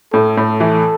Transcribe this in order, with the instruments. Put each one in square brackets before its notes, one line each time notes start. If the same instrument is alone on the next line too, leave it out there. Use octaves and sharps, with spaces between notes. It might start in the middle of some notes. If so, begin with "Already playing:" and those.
[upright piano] A2 [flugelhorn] A4
[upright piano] A2
E3